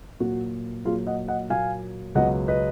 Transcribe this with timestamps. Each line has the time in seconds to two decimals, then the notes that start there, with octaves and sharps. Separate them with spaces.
0.20 A#2 F#3 A#3 F#4
0.85 A#2 F#3 A#3 F4 G#4
1.07 D#5 F#5
1.28 D#5 F#5
1.50 A#2 F#3 A#3 F5 G#5
2.15 C#2 B2 F#3 B3 D#5 F#5
2.48 B4 D#5